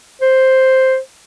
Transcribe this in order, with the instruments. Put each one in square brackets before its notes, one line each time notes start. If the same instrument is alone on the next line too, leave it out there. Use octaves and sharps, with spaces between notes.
[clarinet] C5